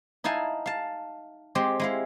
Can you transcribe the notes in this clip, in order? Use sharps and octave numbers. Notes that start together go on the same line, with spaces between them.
D#4 E4 F5 G#5 A5
F5 A5
G#3 C4 G4
G#3 E4 F5